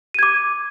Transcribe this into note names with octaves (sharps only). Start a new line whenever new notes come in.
D6 G#6 D#7